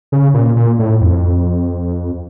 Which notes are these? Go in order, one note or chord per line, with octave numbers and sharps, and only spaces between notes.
C#3
A#2
A#2
A2
F2